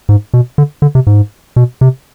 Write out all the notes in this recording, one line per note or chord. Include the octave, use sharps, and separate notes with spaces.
G#2
B2
D3
D3
C3
G#2
B2
C3